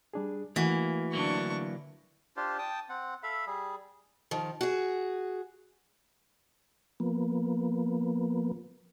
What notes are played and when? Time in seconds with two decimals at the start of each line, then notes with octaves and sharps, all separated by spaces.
0.14 G3 D4 G#4
0.56 E3 A3 A#3 F#4
1.13 D3 F#3 A#3 D4 C#6
2.37 D4 F4 G4 C5
2.59 G5 A5 D#6
2.89 C4 F#5
3.23 A4 E5 F5 B5
3.47 G3 G#4
4.31 D#3 F3
4.61 F#4 G#4
7.00 F3 A#3 B3